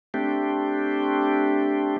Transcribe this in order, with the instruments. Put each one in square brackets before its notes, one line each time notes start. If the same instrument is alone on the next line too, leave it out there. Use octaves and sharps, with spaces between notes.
[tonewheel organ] A3 C4 D4 G4